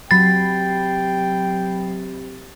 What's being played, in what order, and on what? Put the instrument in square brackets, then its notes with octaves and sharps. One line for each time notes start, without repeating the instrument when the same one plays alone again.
[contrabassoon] C3 [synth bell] F#3 B5 C7 [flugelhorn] G5 [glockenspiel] A6